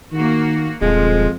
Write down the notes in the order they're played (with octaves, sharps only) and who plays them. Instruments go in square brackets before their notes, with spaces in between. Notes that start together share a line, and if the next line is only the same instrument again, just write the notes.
[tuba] D#3 [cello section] A#3 F#4
[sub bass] D#1 [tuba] F2 [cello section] F3 [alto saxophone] G#3